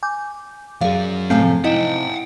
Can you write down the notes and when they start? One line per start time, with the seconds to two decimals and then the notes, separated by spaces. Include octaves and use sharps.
0.03 G#5 D6 G6
0.81 F#2 F#3 G#4 D5 F5
1.30 A2 C3 A3 C4 F5 G#5
1.64 C3 D#4 E4 D#5 F#5 G5